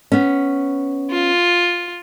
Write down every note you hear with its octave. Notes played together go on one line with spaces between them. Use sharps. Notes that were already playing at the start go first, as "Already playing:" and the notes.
B3 C#4
F4